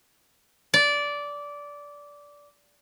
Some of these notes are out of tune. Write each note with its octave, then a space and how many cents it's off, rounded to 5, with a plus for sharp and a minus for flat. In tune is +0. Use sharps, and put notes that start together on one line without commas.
D5 -15